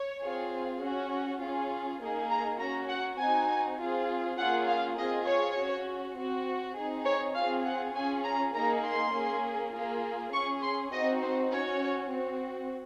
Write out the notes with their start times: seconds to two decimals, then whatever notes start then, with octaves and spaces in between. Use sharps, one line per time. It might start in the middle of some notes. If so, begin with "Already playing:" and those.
Already playing: C#5
0.22 C4 F4 G#4
0.82 C#4 F#4
1.41 C#4 F4 G#4
2.01 A#3 D#4 G#4
2.30 A#5
2.60 C#4 F#4 A#5
2.89 F#5
3.19 C4 D#4 F#4 G#5
3.79 C4 F4 G#4
4.38 A#3 C#4 F4 G#4 F#5
4.68 F5
4.98 C4 F4 G#4 D#5
5.28 C#5
5.57 C#4 F#4
6.16 C4 F#4
6.76 C4 D#4 G#4
7.06 C#5
7.36 C4 F4 G#4 F5
7.65 F#5
7.95 C#4 F4 G#4 G#5
8.24 A#5
8.54 A#3 D#4 G#4 A#5
8.84 C6
9.14 A#3 C#4 G#4
9.73 A#3 F4 G#4
10.33 C#4 G#4 C#6
10.62 C6
10.92 C4 D#4 F#4 D#5
11.22 C5
11.52 C#4 F#4 C#5
12.11 C4 F#4